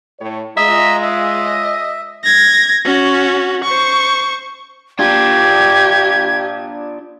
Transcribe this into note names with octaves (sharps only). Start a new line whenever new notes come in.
A2 C#5
G#3 F4 D#5 E5 A#5
D#5 E5
G#6 A#6
C#4 F#4
C5 C#6
D4 F4 G4 G#6